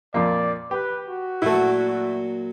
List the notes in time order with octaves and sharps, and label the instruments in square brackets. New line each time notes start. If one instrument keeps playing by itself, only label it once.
[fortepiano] F2 A#2 A#3 [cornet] D5
[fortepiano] G4 [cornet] B4
[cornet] F#4
[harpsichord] A#2 F#3 [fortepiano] A3 E4